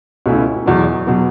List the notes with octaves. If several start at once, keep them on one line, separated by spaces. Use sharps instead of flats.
C#2 B2 A3 C#4 E4
E2 B2 F#3 B3
B2 F#3 B3